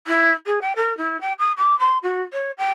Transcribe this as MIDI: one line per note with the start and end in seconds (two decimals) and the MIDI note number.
0.07 0.31 64
0.46 0.59 68
0.61 0.73 79
0.76 0.95 70
0.97 1.20 64
1.21 1.32 79
1.39 1.52 87
1.57 1.77 86
1.79 1.98 84
2.03 2.22 66
2.33 2.51 73
2.57 2.72 79